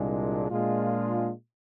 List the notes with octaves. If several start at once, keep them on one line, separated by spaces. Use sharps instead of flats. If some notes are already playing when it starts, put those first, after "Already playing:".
Already playing: C2 A#2 G#3 D4
A#2 G#3 D4 F4